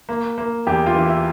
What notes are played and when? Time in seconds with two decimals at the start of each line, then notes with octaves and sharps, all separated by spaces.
0.09 A#3
0.38 A#3
0.67 E2 G4
0.86 F4
0.95 E3
1.05 E4